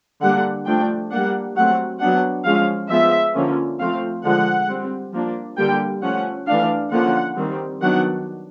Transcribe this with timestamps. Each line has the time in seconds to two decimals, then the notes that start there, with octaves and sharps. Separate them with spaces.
0.22 D3 G3 A#3 D4 F#5
0.66 F3 A3 D4 G5
1.11 G3 A#3 D4 F#5
1.56 F#3 A3 C4 F#5
2.01 F#3 B3 D4 F#5
2.45 F3 G#3 C#4 F5
2.90 F3 G#3 B3 E5
3.34 D3 F3 A#3 C#4
3.79 F3 A3 C4 F5
4.24 D3 F3 G#3 F#5
4.69 G3 C4
5.13 F3 A#3 D4
5.58 D3 G3 A#3 G5
6.02 F3 A3 C#4 F#5
6.47 E3 A3 D4 F5
6.92 D3 F3 A#3 C#4 F#5
7.36 D#3 G3 C4
7.81 D#3 F#3 B3 D4 F#5